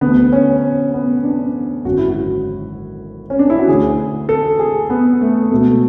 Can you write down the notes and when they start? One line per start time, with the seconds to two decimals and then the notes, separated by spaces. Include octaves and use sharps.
0.01 D2 D3 B3
0.33 C#4
0.94 B3
1.24 D4
1.85 G#1 F#2 D3 F#4
1.98 E4
2.10 F#4
3.30 C#4
3.39 D4
3.50 E4
3.59 F#4
3.68 D2 D3 G#4
4.29 A4
4.59 G#4
4.90 B3
5.21 A3
5.51 C#2 B2 A3